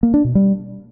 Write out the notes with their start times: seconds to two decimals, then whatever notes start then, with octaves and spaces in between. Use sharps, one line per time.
0.03 A#3
0.14 D4
0.24 B2
0.35 G3